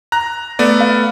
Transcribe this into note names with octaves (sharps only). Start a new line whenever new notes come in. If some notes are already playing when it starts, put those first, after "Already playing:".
A#5 F#6
A3 B3 D5
F5